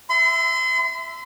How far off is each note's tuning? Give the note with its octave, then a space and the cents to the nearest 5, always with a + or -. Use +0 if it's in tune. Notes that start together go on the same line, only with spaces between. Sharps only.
E5 +0 C6 -40